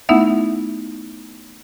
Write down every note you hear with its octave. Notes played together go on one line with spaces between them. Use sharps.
A3 B3 D#4 E4 E5 F#5